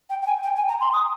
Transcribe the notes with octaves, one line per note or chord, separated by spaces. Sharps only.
G5
G5
G#5
G5
G#5
A#5
C6
D#6